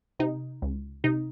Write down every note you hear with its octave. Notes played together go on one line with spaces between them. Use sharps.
C3 D#4
C#2
C3 D#4